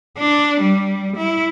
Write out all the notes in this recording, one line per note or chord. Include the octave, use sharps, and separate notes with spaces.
D4
G3
E4